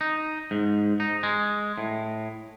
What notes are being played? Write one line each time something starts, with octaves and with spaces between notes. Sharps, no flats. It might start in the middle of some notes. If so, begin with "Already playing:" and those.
D#4
G#2
D#4
G#3
A2